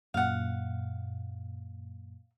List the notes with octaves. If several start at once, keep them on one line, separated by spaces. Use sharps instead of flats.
F#2 A#2 F5 F#5